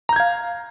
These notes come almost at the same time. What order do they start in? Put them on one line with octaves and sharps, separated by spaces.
A#5 G6 G#6 F5